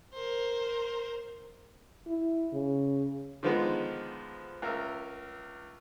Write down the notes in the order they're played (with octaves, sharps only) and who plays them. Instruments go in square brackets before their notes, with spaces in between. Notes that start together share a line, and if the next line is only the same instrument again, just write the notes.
[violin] A#4 C5
[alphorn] E4
C#3
[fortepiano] D3 D#3 F3 G#3 B3 D#4
C#2 A#4 E5